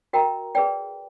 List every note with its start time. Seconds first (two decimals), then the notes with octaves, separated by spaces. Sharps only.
0.13 F#4 A#4 D#5 G5 A#5
0.55 G#4 B4 D5 G5